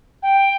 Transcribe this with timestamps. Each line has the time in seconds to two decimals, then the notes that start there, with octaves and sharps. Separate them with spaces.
0.22 G5